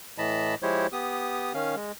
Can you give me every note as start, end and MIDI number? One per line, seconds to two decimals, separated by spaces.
0.18 0.55 45
0.18 0.55 52
0.18 0.55 75
0.18 0.55 81
0.18 0.55 83
0.63 0.87 53
0.63 0.87 56
0.63 0.87 64
0.63 0.87 67
0.63 0.87 72
0.63 0.87 73
0.93 1.53 59
0.93 1.53 67
0.93 1.53 87
1.54 1.75 51
1.54 1.75 61
1.54 1.75 77
1.76 1.92 56